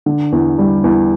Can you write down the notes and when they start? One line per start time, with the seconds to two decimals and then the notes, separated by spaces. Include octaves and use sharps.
0.06 D3
0.32 E2
0.58 G3
0.84 E2